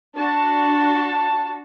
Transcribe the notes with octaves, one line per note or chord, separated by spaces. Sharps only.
D4 F#4 A5